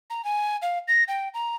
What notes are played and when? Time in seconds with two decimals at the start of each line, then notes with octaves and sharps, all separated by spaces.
0.10 A#5
0.24 G#5
0.62 F5
0.88 A#6
1.08 G5
1.34 A#5